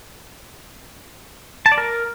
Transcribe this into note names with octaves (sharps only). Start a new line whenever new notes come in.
A5
D5
A#4